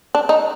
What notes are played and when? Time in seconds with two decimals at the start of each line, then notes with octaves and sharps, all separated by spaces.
0.15 D4
0.29 D#4